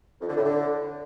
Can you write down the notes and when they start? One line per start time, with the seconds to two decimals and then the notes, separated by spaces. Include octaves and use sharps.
0.21 F2
0.29 D3
0.37 A2
0.45 D3